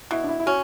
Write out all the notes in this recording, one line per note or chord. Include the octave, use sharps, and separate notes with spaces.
B2 E4
D4
E4
E4
C#4 F#4